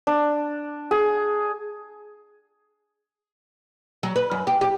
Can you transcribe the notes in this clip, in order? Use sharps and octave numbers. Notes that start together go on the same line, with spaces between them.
D4
G#4
F#3
B4
F#2
G4
G4